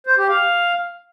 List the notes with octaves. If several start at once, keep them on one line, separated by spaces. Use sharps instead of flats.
C5
G4
F5